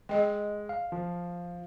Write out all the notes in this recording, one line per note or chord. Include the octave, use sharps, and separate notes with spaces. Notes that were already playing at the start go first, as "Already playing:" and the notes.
G#3 G#4 D#5 G5
F5
F3